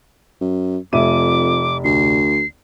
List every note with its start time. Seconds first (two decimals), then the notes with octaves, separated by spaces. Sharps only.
0.41 F#2
0.93 F1 F2 E5 D6 D#7
1.84 D2 C7